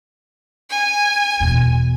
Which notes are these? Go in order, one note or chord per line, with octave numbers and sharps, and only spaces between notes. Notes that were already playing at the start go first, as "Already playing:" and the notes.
G#5
E2 B2